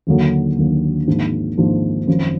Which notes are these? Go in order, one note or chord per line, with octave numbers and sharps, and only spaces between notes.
D#2 D3 F#3 A#3
D#2 D3 F#3 A#3
G#1 G#2 F3 A#3 D4
G#1 G#2 F3 A#3 D4
G#1 F#2 F3